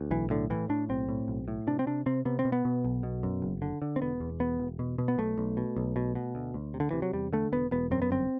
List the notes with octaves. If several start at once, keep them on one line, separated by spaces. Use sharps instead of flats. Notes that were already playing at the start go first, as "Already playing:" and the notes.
Already playing: D2
B1 E3
A2 D3
A2 E3
A2 D4
B1 C4
A2
B1
A2
C3 D4
C4
C3 D4
C3 C4
C3 B3
C4
B2
B3
B2
B1
B2
F#2
F#1
D3
D3
C4
E1 B3
E2
E1 B3
E1
B2
B2
B3
B1 A3
B1
B2
B1
B2
B2
D2
D2
C3
D3
C3 E3
F#3
E2 G3
D3 A3
E1 B3
E1 B3
F#2 C4
B3
G1 C4